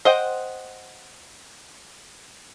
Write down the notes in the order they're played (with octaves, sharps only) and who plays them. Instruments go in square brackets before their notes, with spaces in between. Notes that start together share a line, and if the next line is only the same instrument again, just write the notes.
[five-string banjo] C5 D#5 F#5 G5